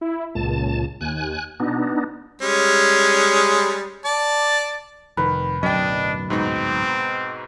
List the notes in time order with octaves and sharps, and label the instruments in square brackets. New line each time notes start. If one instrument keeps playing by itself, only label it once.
[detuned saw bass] E4
[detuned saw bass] C#2 [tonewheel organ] A#2 A5
[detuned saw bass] D#2 [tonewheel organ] G#5 F#6
[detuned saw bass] B2 [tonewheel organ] B3 D4 D#4
[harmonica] G3 G#3 C#4
D5 A5
[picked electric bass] F1 [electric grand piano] D#3 [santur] B4
[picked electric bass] D1 B1 F#2 [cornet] D4 [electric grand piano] D#5 G5
[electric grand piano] G#2 B2 D#4 [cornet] C4